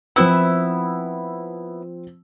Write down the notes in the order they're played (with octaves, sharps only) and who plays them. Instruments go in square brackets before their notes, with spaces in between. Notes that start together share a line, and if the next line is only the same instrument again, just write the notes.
[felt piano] F3 C4 E6 [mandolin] B3 E4